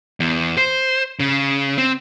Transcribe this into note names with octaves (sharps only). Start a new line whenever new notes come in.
E2
C5
C#3
C4